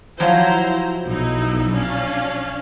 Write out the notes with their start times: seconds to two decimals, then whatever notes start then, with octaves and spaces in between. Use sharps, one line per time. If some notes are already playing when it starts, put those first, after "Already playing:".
0.20 F3 F#3 E4 C5 A#5
1.07 B1 D#4 E4
1.72 C#4 D4 F5